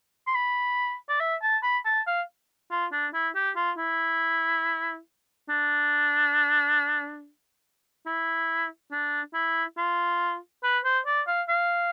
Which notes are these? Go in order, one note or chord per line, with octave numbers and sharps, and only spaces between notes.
C6
B5
D5
E5
A5
B5
A5
F5
F4
D4
E4
G4
F4
E4
D4
E4
D4
E4
F4
B4
C5
D5
F5
F5